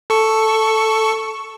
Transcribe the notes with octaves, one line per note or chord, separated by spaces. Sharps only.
A4 C#6